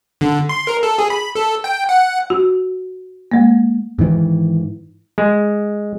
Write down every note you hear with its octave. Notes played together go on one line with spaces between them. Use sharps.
D3
C6
A#4
A4
G#4
B5
A4
G5
F#5
F#4
G#3 A#3
G#2 D#3 E3
G#3